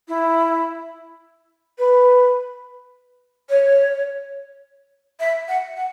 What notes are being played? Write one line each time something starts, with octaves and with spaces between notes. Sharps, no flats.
E4
B4
C#5
E5
F#5
F#5